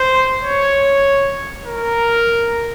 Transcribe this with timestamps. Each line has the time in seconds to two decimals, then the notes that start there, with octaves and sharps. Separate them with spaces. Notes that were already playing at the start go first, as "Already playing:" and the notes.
Already playing: C5
0.44 C#5
1.65 A#4